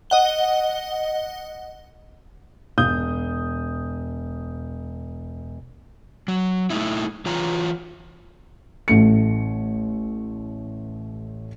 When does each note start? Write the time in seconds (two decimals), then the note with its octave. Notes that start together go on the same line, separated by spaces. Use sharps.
0.10 D#5 F#5 G7
2.78 E1 D#6 G6
6.28 F#3
6.70 A3 D#4 E4
7.26 E3 F4 C#5 A#5
8.88 A1 A3 C#7